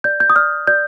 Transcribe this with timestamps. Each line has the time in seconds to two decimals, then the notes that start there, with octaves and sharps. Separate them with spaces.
0.04 D5 G6
0.20 G6
0.30 D#6
0.36 D5 F6
0.67 D5 G6